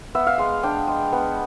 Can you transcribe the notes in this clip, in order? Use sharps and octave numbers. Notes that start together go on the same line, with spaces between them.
B3 E5
F5
G#3 F5
D4 G5
G#3
B3